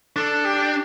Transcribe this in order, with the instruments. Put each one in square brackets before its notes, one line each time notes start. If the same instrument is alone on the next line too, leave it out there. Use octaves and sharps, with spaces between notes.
[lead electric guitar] D4 [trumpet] A4
[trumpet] G4